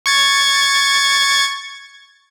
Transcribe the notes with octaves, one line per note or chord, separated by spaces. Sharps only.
C#6 G#6 A6